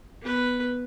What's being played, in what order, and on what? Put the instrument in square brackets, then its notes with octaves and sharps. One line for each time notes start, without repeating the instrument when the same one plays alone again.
[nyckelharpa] B3 B4